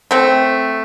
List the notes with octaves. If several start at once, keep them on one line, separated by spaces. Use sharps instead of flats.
A3 C4